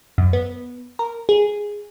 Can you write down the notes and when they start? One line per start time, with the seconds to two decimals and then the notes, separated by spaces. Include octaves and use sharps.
0.18 F#2
0.33 B3
0.99 A#4
1.29 G#4